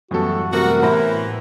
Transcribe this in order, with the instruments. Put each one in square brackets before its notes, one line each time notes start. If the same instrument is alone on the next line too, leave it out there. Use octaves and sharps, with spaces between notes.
[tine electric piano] F#2 E3 B3 [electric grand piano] A2 G3 A4 [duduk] F#4
[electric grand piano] C3 G3 A3 [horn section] F#4 [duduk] A#4
[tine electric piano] A2 [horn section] E3 [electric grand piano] C5 B5 A#6